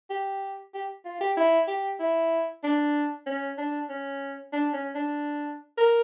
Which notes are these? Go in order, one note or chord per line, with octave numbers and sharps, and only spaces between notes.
G4
G4
F4
G4
E4
G4
E4
D4
C#4
D4
C#4
D4
C#4
D4
A#4